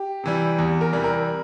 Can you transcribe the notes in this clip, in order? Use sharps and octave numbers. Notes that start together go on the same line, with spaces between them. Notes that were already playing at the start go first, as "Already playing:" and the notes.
Already playing: G4
C3 E3 G3
E2
A#4
C3 E3 G3
A#4